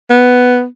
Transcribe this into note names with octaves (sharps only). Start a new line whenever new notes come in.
B3